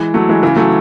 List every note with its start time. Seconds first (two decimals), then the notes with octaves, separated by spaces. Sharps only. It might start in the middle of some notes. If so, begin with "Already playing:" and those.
Already playing: E3 G#3
0.14 F#3 A3
0.29 E3 G#3
0.43 C#3 E3
0.56 F#3 A3